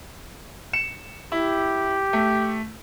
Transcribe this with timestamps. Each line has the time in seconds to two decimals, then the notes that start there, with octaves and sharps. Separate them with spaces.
0.73 C#7 E7
1.32 E4 G4
2.13 A3